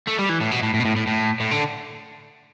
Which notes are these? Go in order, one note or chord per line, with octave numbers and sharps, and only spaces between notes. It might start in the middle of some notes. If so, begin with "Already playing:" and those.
A3
G3
E3
A2
B2
A2
A2
B2
A2
A2
A2
A2
D3